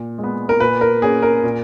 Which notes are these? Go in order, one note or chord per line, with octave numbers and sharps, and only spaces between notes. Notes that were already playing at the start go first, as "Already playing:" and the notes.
Already playing: A#2
G#3 B3
A#4
A#2 B4
A#4
A#3 C#4 G#4
A#4
A#2